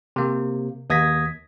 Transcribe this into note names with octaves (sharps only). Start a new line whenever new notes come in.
C3 A#3
D#2 D#6 G#6 A#6 B6